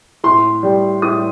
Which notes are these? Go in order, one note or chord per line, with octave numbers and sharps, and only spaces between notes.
A2 C6
G3
A2 D#6